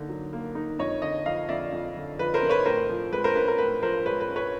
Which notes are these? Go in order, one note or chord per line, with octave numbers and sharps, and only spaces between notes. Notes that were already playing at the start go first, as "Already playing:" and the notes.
Already playing: D3 A#3 D#4
F#3
A#3
D#4
F2 C#5 D#5
D3 C#5 D#5
F3 D#5 F5
F2 D5 E5
F2
D3
F3 B4
A#4 C5
F2
B4 C#5
A2 A#4 C5
F3
G#3 B4
A#4 C5
C#4 B4
A#4
A2 B4
F3 A#4 C5
G#3 B4 C#5
B4
C#4
B4 C#5